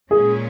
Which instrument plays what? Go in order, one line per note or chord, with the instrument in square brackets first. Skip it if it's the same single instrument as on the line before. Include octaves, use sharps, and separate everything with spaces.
[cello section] A#2 G#3 C#4 [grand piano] G#4